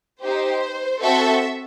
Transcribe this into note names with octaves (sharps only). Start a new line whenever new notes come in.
D#4 G4 C5
C4 F#4 A4 E5